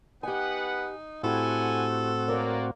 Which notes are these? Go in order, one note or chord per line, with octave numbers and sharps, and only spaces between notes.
B3 D#4 G4 B4 F#5 G#5
A2 C4 E4 F#4 G4 A4 F#5 G#5
A#3 A#4 C#5 D5